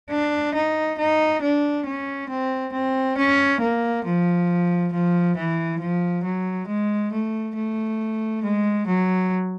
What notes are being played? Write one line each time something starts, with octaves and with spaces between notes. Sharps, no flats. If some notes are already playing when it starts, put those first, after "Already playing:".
D4
D#4
D#4
D4
C#4
C4
C4
C#4
A#3
F3
F3
E3
F3
F#3
G#3
A3
A3
G#3
F#3